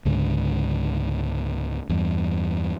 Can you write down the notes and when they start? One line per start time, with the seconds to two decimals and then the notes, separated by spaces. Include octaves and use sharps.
0.05 C#2 G#2 D3
1.89 E2 G2